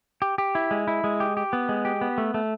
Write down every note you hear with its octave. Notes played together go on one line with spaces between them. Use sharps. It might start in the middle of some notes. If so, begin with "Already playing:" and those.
G4
G4
E4
G#3
E4
G#3
G4
G4
B3
G#3
G4
B3
A3
A3